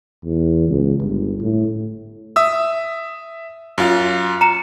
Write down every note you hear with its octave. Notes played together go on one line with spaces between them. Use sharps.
E2
C#2
G1
A2
E5 D#6 E6
F#2 F4 F5
A#5 C#7 E7